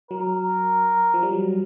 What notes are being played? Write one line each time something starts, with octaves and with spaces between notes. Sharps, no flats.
F#3 A#4
F3
G3
F#3